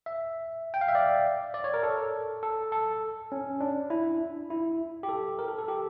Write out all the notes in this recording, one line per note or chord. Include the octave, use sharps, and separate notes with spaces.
E5
G5
F5
E5
D5
D5
C#5
A#4
A4
A4
A4
C#4
D4
E4
E4
G4
A4
A#4
A4
A4
G4